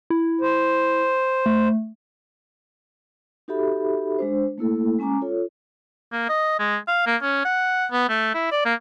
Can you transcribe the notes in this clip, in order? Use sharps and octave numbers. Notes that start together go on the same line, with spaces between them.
E4
C5
A3
D#4 F#4 G4 A4 E5 B5
G#3 D4 C5
A3 A#3 E4 A4
G#3 C#4 G#5 A#5 D6
F4 A4 C#5
A#3
D#5
G#3
F5
A#3
C#4
F#5
B3
A3
E4
D5
A#3